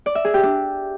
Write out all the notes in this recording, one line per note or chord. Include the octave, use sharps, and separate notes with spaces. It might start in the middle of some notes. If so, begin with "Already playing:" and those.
D5
E5
G#4
G4
D4